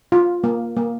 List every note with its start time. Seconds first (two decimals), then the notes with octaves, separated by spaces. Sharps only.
0.12 F4
0.44 A#3
0.77 A#3